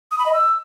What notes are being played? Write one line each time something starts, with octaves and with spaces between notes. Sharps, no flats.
D#6
B5
D#5
E6